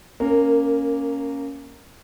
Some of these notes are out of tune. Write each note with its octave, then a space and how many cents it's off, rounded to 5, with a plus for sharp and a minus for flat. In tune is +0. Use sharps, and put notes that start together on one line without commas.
A#3 +0 C#4 +0 A#4 -20